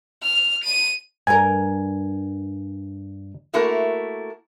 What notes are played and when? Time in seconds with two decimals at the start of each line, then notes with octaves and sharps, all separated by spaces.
0.23 F6
0.64 D#7
1.27 G2 A#4 G#5
3.54 A3 A#3 E4 F#4 A#4